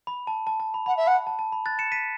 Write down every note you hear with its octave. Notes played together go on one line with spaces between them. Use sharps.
B5
A5
A5
A5
B5
F#5 B5
E5
F#5 B5
A5
A5
B5
F#6 A6
C#7 E7
B6 D#7